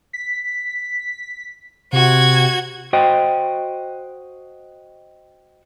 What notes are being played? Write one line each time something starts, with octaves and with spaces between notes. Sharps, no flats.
B6
C3 F#4 G#6
F#4 C5 D#5 G5